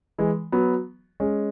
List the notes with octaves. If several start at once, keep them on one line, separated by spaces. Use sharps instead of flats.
E3 G#3
F#3 B3
G#3 C#4